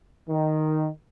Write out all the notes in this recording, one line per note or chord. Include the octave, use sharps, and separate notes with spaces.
D#3